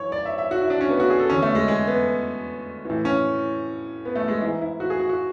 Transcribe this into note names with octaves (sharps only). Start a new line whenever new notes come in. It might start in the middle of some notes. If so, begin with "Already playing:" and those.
Already playing: F#2 E3 C#5
D5
E5
E5
F#4
E4
D4
C#4
B3
F#4
G#4
A4
E2 D3 C#4
A3
G#3
G#3
B3
A2 E3
C#4
B3
A3
G#3
G#2 E3 E4
E4
F#4
G#4
F#4
F#4